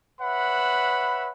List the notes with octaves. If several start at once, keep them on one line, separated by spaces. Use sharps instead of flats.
B4 C#5 E5 F#5 B5